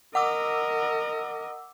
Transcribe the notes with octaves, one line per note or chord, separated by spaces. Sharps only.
A#4 D#5 F#5 D6 E6